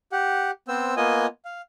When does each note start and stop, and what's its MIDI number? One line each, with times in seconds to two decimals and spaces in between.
0.12 0.51 67
0.12 0.51 78
0.68 0.95 59
0.68 0.95 60
0.68 0.95 72
0.68 0.95 88
0.97 1.26 58
0.97 1.26 59
0.97 1.26 65
0.97 1.26 75
0.97 1.26 80
0.97 1.26 87
1.45 1.61 77